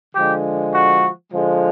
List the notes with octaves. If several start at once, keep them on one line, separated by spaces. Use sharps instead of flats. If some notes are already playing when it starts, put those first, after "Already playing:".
D3 F3 G#3 G4
F#4
D3 F3 G#3